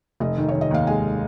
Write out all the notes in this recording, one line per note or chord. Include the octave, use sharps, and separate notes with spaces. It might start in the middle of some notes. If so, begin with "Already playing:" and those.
F1 D#5
D#3
C#5
D#3
D#5
D#2 F5
G#3 G#5